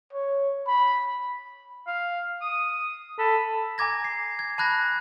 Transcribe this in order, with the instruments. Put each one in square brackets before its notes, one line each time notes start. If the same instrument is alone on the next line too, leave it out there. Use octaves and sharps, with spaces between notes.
[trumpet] C#5
B5
[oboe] F5
D#6
[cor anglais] A4 [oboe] B5
[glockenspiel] G#5 A#5 D6 G#6 A#6
C7
G#6
A5 B5 F#6 G#6 A#6